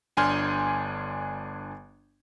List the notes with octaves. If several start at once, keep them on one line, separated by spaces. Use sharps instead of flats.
G1 D4 G#5 C6 F6 G6